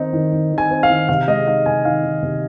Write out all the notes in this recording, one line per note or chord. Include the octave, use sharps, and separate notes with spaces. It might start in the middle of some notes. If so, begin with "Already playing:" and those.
Already playing: D#3 C4 D#4
D#3
D#3
D#3
G#5
C4
F5
D#3
C3 F5
G#3 D#5
D#4 F5
C3 G#5
D#3 F5
D#3
C3